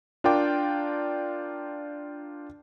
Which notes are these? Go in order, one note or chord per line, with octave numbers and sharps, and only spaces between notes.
D4 F4 A#4 D5 G5 D6